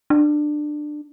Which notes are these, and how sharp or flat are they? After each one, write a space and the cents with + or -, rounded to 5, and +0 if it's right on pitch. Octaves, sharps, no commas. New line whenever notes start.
D4 +20